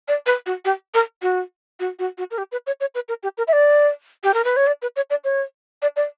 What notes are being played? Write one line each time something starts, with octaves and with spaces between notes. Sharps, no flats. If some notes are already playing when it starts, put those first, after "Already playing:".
D5
B4
F#4
G4
A#4
F#4
F#4
F#4
F#4
A#4
G4
B4
C#5
C#5
B4
A#4
G4
A#4
E5
D5
G4
A#4
B4
C#5
D5
B4
C#5
D5
C#5
D5
D5